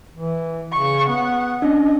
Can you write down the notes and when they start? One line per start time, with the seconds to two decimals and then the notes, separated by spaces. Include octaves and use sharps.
0.15 E3
0.72 C#3 C#6
1.08 B3 F#5
1.62 C#4 D4 D#5